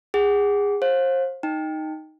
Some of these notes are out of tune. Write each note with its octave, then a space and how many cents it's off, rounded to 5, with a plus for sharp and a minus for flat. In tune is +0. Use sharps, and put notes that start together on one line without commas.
G#4 -25 F#5 +15
C5 +30 F5 +25
D#4 +0 G5 +15